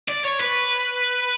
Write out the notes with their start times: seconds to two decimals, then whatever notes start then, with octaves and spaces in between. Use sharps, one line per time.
0.09 D5
0.25 C#5
0.41 B4